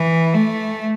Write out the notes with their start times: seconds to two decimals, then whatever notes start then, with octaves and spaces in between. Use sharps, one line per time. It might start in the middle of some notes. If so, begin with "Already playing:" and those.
Already playing: E3
0.34 A3